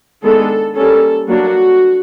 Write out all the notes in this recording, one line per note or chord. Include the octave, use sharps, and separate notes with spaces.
D#3 G#3 B3 D4 A4
G3 A#3 C#4 A4
F#3 A#3 D4 F#4